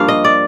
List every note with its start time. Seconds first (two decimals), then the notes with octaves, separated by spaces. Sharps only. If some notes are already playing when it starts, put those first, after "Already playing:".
Already playing: G2 F3 A#3 F5
0.08 D#5
0.24 D5